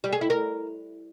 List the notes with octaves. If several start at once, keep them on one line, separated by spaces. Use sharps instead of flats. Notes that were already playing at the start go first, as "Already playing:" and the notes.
G3
G#4
E4
A#4